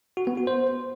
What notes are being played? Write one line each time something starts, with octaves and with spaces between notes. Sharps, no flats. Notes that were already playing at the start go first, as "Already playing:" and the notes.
F#4
B3
F#4
C5